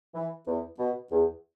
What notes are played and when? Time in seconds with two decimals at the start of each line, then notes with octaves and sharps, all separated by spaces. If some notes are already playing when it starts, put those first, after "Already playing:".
0.14 E3
0.46 E2
0.79 B2
1.11 E2